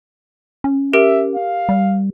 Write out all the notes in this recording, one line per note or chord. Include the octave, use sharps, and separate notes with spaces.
C#4
G4 A#4 E5 D7
F5
G3